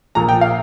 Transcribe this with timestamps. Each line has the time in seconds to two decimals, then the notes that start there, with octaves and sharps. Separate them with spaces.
0.15 A#1 A#2 F3 A#5
0.29 G5
0.41 F5